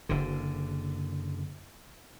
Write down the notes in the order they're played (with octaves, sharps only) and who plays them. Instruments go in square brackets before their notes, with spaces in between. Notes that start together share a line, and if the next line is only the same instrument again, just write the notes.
[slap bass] F#1 D3